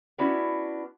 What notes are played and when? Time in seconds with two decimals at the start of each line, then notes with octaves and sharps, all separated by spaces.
0.18 B3 C#4 D4 E4 F#4